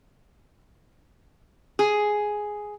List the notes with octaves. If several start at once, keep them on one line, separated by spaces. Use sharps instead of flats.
G#4